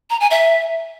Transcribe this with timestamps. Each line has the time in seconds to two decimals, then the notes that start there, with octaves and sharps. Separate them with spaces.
0.10 A#5
0.20 G#5
0.31 E5